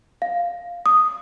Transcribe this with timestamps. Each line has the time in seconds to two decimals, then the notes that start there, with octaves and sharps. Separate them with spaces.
0.22 F5
0.86 D#6